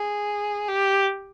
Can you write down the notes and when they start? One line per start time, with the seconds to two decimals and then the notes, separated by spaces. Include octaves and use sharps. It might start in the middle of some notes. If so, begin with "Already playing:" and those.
Already playing: G#4
0.68 G4